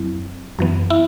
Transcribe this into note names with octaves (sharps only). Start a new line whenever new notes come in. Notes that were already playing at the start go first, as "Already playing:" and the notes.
Already playing: F#2 F#3 C4 E4
F#2 E3 B3
E4